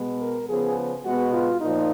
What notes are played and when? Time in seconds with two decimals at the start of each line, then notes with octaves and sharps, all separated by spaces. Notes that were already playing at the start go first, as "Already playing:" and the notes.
Already playing: B2 G#3 B3
0.21 A#4
0.50 C#3 F3 B3 G#4
1.05 B2 G#3 B3 F#4
1.33 F4
1.61 A#2 F3 D#4